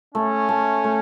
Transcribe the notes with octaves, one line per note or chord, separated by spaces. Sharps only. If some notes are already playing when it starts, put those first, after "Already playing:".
A3 C#4
A3
A3